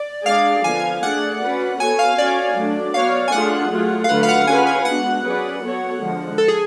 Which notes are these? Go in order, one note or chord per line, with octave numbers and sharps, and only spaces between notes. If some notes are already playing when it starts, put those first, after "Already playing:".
Already playing: D5
G#3 D4 G#4 D5 F5
D3 F3 B3 G#5
G#5
A3 D4 G#4 D5 F#5
C#4 F#4 B4 D5
B3 F#4 A4 C#5 G#5
F5
C#4 F#4 C#5 D5
F#3 A3 D4
B3 F#4 C#5 F5
G#5
A3 D4 F4 G#4 F#5
F#3 A3 F4 G#4
F5
D3 F#3 A3 F4 B4 F#5
F5
F#5
C#4 F4 G#4 B4 G#5
G#5
G#3 B3 D4 F#4 F#5
F#3 C#4 G#4 B4 D5
B3 F#4 A4 C#5
D3 F3 G#3
A4
G#4